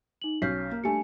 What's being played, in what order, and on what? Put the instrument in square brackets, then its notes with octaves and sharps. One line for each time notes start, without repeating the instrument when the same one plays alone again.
[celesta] D#4 F#7
[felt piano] B1 C#4 C7 [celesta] F6 G6 B6
[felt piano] A#3
[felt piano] G3 A3 [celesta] D4 G#5 C#7